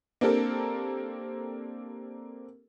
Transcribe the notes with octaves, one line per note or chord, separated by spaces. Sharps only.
A#3 C4 D4 G4 A4 A#4